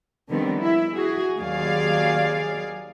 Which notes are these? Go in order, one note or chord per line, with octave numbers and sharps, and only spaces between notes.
D3 D#3 F3 G3 B3 C4
E4 E5
F#4 G#4
D#2 F#3 G#4 D5 F5